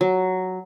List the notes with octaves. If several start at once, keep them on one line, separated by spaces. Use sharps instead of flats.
F#3